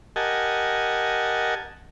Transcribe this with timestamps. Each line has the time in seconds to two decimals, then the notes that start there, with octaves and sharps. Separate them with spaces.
0.16 G4 A#4 D#5 F#5 G#5 A5